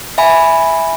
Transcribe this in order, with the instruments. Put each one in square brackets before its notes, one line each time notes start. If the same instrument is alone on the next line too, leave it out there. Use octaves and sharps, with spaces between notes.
[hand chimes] E5 G#5 B5